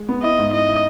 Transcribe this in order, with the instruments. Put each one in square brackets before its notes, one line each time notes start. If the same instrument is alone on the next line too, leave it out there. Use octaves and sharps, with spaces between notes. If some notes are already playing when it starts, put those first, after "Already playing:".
Already playing: [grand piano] G#3
B3
[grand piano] E4 [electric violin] D#5
[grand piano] G#2
[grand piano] E4 [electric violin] D#5
[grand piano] E4